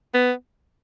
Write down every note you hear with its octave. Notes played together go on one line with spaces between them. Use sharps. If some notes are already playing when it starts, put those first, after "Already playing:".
B3